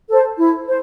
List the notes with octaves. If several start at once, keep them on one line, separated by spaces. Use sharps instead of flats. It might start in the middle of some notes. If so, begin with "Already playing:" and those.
A4 C5
E4
C5